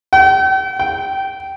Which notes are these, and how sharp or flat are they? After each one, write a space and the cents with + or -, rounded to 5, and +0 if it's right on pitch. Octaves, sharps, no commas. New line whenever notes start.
G5 -40
G5 -15